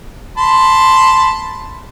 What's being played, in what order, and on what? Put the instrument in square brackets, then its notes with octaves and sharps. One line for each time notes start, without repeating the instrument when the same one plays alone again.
[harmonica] A5 B5 C6